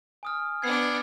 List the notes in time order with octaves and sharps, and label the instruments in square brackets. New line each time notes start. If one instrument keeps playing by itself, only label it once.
[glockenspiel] G#5 D#6 F6
[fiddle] B3 D4 [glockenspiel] G#6 C7